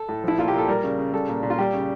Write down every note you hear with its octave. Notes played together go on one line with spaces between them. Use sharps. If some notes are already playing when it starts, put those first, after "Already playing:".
Already playing: A4
A2
F3 E4
A#2 F4
G4
A#2 A4
G3 A#4
C#3
C#3
G3 A4
A#2
A#2
F4
G3 G4
C#3